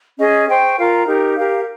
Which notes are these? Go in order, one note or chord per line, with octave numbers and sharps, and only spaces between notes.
C#4 G#4 D#5
C5 G5 C#6
F4 A#4 F5 A#5
D#4 G4 A#4
G4 A#4 F5